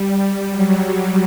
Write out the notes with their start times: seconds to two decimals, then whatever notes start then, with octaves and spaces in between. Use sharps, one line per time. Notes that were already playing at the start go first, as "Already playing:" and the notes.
Already playing: G3
0.50 F#3
0.85 F#3